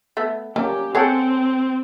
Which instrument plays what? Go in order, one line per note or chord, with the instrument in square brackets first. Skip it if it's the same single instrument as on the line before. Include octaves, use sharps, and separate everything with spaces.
[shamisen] A3 B3
[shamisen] G3 [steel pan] A#3 C#4 [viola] G4
[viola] C4 [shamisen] G#4 C#5 [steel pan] A4 F#5 G5